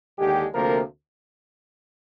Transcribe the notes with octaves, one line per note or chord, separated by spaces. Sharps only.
D#2 D3 G#3 G4
D2 C3 F3 A#3 A#4